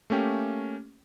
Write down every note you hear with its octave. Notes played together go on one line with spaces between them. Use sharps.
A3 A#3 C#4 G4